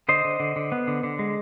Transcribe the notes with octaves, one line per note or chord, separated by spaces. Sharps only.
D3 C5 D#5
D3
D3
D3
B3
D3
D3
G#3